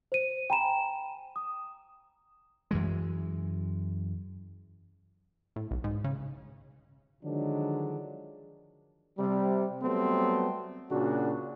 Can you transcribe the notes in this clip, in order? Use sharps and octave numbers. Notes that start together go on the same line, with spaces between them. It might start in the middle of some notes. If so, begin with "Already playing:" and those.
C5 D#7
G5 G#5 A#5 B5 E7
D#6
F#2 E3 G#3
A2
B1
G#2
C#3
D3 D#3 F3 F#3 G#3 D4
C3 G3
F#3 G3 A3 B3 C4
A#2 C#3 D4 F#4